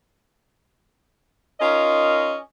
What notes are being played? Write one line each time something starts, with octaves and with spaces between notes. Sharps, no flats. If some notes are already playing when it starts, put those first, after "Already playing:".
C#4 D#4 F4 A#4 D#5